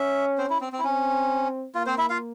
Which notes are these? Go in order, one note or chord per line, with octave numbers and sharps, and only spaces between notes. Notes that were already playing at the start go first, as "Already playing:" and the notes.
Already playing: C#4 E5
C4 C5
E4
C4
C4
E4
C4 C#4
A#3 F4
C4 C5
E4 E5
F4 F5